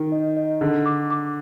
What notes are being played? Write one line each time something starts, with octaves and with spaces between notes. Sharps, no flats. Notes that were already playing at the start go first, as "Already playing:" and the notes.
Already playing: D#3
D#5
D#5
D3 G#4
D6
D6